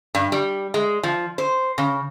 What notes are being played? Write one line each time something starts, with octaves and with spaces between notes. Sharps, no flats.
G2
G3
G#3
F3
C5
C#3